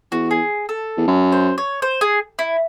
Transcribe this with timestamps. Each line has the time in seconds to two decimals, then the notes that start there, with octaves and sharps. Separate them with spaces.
0.12 E2 F#4
0.31 G#4
0.69 A4
0.97 E2
1.07 F#2
1.32 C5
1.58 C#5
1.82 C5
2.01 G#4
2.39 E4